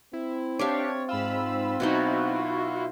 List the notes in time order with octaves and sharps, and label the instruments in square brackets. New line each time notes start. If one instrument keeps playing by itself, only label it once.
[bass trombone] C4 [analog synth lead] E4
[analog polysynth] D4 G4 [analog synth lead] C#5 [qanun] D5 E5 F5
[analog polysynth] G#2 B5 E6 [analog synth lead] F4
[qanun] B2 F#3 D#4 [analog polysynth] E4 F#4